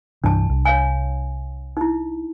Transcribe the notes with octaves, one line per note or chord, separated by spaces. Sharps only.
C2 G2 E3 D4 A5
C2
C#5 F5 G#5
D#4 E4